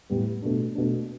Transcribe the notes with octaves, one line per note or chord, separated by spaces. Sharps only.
A2 G3 B3
B2 A3 D4
B2 A3 D4